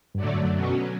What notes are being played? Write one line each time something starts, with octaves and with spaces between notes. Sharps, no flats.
G2 D3 F#3 A3 D4
A2
G2
F#2
B2 F#3 C#4